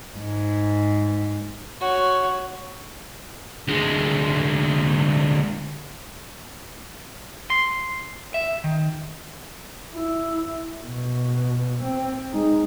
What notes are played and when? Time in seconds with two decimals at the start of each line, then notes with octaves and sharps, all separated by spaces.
0.18 G#2
1.81 F#4 C#5
3.68 D2 G#3
7.50 C6
8.34 E5
8.64 D#3
9.95 E4
10.85 B2
11.84 C4
12.32 G#3 D#4